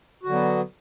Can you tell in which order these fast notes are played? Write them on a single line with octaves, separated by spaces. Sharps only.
F#4 D3 F#3 B3